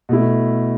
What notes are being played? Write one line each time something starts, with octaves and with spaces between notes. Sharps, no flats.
B2 A3 E4